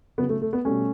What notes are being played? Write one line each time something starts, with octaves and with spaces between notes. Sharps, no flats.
C#3 F#3 B3
A3
A3
B3
B2 G3 A3 C#4